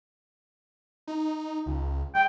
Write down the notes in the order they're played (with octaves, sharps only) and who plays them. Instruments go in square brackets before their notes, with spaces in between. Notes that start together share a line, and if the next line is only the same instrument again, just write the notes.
[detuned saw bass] D#4
C#2
[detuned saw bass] G#3 [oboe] G5